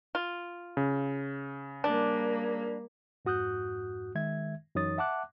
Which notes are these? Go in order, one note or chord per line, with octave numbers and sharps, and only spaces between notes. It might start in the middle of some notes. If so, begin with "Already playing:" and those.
F4
C#3
G3 A#3 D4
F2 G#2 F#4 D#6 F#6 G6
D#3 G#3 E5 G#6
F#2 E3 D#4 C#5 D#6 A6
E5 F#5 A5 D6 F#6